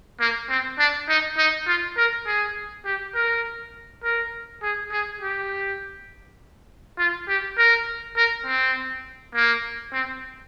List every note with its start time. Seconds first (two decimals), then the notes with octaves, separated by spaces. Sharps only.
0.20 A#3
0.49 C4
0.79 D4
1.08 D#4
1.38 D#4
1.67 F4
1.97 A#4
2.26 G#4
2.85 G4
3.15 A#4
4.04 A#4
4.63 G#4
4.92 G#4
5.21 G4
6.99 F4
7.28 G4
7.57 A#4
8.17 A#4
8.46 C4
9.35 A#3
9.93 C4